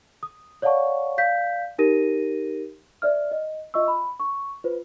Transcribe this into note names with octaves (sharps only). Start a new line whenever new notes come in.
D#6
C#5 D5 F5 F#5 A5 C#6
D5 F5 G6 B6
D#4 G4 A#4 A#6 D#7
C5 D5 E5 F6
D#5
F4 D#5 E5 C#6 E6
B5
C#6
F4 B4 C5